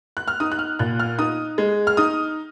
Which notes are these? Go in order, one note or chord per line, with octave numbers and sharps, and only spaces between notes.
F#6
F6
D#4 D#6
F#6
F6
A#2 F#6
F6
D#4 D#6
G#3
F6
D#4 D#6